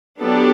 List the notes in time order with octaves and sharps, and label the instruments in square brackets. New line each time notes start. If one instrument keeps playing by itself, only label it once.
[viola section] F#3 B3 D4 G4 A4